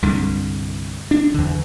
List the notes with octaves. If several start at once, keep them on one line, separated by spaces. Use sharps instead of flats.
C2 G2 D3
D4
E2 D3